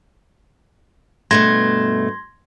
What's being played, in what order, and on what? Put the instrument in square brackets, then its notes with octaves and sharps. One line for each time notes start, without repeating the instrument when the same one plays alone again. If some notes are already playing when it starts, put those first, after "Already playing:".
[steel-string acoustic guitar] G2 B2 A3 [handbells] C6 G#6 A#6